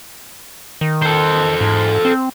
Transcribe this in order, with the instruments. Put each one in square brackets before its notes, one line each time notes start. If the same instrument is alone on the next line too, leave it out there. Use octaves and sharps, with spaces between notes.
[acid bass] D#3
[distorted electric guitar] A4 C5
[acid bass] G#2
C4